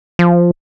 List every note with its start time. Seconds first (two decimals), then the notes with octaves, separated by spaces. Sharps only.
0.19 F3